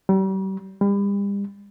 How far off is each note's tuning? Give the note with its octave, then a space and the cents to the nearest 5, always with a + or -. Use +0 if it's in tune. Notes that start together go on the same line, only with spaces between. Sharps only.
G3 -40
G3 +35